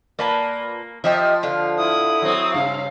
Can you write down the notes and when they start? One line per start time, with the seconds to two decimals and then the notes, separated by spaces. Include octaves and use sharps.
0.19 A#2 A#3 B4 A5
1.04 F3 G4 D#5 E5
1.43 D3 F4
1.78 E4 D#6
2.22 F#3 C4
2.54 G2 C#3 F5